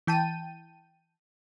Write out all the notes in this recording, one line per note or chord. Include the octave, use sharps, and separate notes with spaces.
E3 G5 A5 D#7